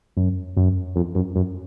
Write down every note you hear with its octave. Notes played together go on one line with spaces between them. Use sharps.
F#2
F#2
F2
F#2
F#2